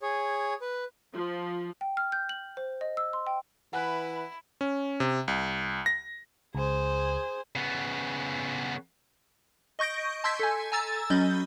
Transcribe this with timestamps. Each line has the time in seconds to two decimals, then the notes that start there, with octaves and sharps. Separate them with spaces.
0.02 G#4 C#5
0.61 B4
1.13 F3
1.81 G5
1.97 F6
2.12 G6
2.29 F#7
2.57 C5
2.81 D#5
2.97 E6
3.13 C6
3.27 G5
3.73 E3 E4 B4 F#5 G#5 F#6
4.61 C#4
5.00 C3
5.28 C2
5.86 A#6
6.55 C#2 G#4 C5
7.56 C#3 B3
9.79 D#5 C#6 G6 A#6 D7
10.24 A5 C6 E6 G6 G#6 B6
10.39 A4 G#5
10.72 G#5 A#5 E6 A6
11.10 F#3 C#4 D#5 B5 G6